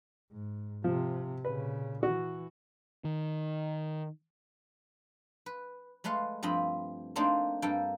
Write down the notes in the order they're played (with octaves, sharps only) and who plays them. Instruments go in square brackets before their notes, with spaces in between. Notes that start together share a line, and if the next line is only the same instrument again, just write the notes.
[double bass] G#2
[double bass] C3 [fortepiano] F3
[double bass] A#2 C#3 [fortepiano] B4
[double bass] E3 [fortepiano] F#4
[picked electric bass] D#3
[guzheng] B4
G#3 A3 B4 F5 C6
G2 F3 C4 D#5 B5
A3 A#3 C4 D4 D#4 C5
G2 A#3 A4 G5